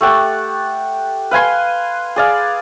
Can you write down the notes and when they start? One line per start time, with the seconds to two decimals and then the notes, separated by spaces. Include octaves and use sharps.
0.01 A3 G4 F#5 A5
1.31 B4 F5 G#5 C6
2.16 G#4 D5 F5